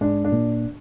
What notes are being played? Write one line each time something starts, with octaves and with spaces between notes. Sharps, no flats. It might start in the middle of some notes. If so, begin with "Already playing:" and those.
G#2 G#3 D4
D4
A#2 A#3